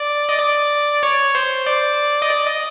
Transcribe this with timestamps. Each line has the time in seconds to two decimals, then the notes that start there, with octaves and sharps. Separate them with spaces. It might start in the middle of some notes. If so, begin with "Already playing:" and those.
Already playing: D5
0.29 D#5
0.39 D5
1.03 C#5
1.35 C5
1.67 D5
2.22 D#5
2.30 D5
2.47 D#5